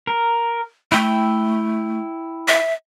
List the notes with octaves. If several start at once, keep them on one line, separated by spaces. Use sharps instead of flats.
A#4
A3 E4 G5 E6
E5